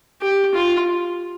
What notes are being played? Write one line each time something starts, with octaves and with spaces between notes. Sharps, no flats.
G4
F4